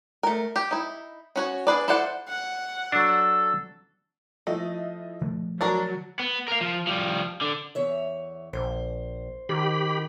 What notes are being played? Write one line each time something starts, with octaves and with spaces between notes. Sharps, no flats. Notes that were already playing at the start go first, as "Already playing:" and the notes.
A3 A#4
G4
D#4 E4
C#4 F#4 C#5
D4 G#4 B4 D5
E4 A4 C5 D5 F#5
F#5
F#3 D4 A4
F3 A3 E4 D#5
D3 F3 A3
F#3 D4 F#4 A#4 A6
B3
A#4 F5
F3
F3 G3
D3
E2 C#5 E5
A#1 C5
D#3 G4 B5